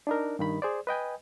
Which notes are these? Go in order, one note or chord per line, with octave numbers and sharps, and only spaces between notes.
D4 D#4 A#4
G2 D#3 B5
G#4 C5 D5
B4 D#5 G5 G#5